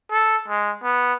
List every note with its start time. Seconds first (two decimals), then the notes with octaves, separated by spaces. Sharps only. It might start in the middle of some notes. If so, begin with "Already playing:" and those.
0.11 A4
0.48 G#3
0.84 B3